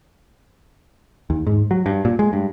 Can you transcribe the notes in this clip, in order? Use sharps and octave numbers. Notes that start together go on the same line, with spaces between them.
D#2
G#2
F#3
G2
A#2
G#3
G2